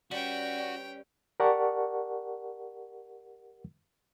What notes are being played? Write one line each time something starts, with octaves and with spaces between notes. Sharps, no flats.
G3 C#4 F#4 B4 C#5 G5
G4 A#4 D5 F#5 A5 C#6